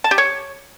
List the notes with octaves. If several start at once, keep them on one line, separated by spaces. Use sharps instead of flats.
A5
G4
C#5